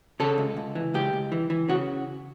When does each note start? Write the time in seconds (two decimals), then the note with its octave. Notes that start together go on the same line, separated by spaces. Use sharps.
0.20 C#3 A4
0.38 C#2
0.57 C#2
0.75 E3
0.94 C#2 G4
1.13 C#2
1.32 E3
1.50 E3
1.69 C#3 F#4